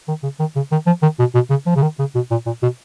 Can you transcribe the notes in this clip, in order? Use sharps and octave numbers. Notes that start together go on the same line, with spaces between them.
D#3
C#3
D#3
C#3
D#3
F3
D#3
B2
B2
C#3
F3
C#3
D#3
C#3
B2
A#2
A#2
B2